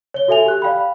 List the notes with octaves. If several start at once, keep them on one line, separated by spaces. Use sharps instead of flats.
C#5 G7
F#4 A4 E5 G#5 F7
G4 F#6
D5 F5 G5 B5